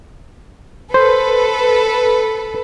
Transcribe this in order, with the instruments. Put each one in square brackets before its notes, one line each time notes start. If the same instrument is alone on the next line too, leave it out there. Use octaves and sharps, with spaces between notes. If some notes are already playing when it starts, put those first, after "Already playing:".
[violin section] A4 B4 [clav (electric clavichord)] C5